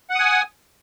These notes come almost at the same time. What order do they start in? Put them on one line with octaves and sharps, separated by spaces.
F#5 D#6 G#5